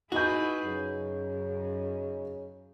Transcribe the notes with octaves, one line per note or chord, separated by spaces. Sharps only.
D#4 E4 F#4 G#4 B4 G6
F#2 C#3